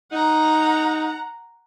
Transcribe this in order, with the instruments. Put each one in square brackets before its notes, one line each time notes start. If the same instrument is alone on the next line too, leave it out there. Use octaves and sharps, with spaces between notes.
[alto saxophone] D#4 [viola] F#5 A#5